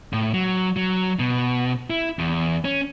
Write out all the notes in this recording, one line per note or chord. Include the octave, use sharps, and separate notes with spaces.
A2
F#3
F#3
B2
E4
E2
C#4